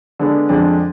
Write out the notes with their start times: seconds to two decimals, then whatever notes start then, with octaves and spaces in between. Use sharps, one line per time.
0.19 D3 G#3 B3 D4
0.49 F2 D3 G#3 D4